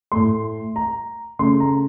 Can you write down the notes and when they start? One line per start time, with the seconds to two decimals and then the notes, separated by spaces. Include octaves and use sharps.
0.12 A2 A3 C6
0.76 A#5
1.39 C#3 A3 C6
1.60 A#5